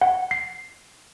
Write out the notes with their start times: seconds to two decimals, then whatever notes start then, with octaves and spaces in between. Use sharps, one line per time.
0.01 F#5
0.31 C7